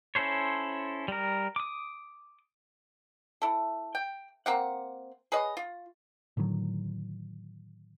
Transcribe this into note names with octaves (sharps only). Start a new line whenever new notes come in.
C#4 E4 A4 C5 C#5
G3 A#4
D6 D#6
E4 A4
G5
A#3 C4 F#5
G#4 B4 C#5 D#5
F4
A2 D3 D#3 F#3